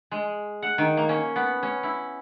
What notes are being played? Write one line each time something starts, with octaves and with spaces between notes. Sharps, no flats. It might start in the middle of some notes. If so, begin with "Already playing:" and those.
G#3
F#5
D#3
A#3
C#4
B3
C#4
E4